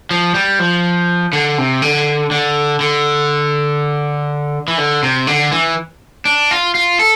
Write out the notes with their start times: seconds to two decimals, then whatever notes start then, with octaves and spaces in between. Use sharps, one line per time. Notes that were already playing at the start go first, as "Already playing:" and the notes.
0.11 F3
0.35 G3
0.59 F3
1.33 D3
1.58 C3
1.82 D3
2.31 D3
2.81 D3
4.68 E3
4.78 D3
5.03 C3
5.27 D3
5.52 E3
6.25 D4
6.51 F4
6.75 F4
6.99 A4